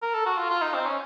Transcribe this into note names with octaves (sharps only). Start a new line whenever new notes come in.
A#4
A4
F#4
F4
F4
D#4
C4
C#4